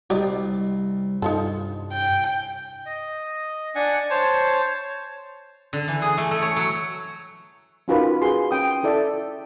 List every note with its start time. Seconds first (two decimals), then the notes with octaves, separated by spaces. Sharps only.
0.10 C2 G3 G4 D5 D#5
1.22 G2 D#4 F4 A4
1.93 G5
2.86 D#5
3.75 D4 D5 F#5 G#5
4.10 C5 C#5 A5
5.73 D3
5.88 E3
6.02 G#4
6.18 A3
6.31 A3
6.42 C#5
6.56 F#3
7.88 C#4 D#4 F4 F#4 A#4 B4
8.22 F#4 G#4 C6
8.51 C#4 G5 D#6
8.83 E4 A4 D5 E5